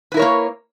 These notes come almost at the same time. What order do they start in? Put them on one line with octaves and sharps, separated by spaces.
B4 E4 A#4 C#5 A#3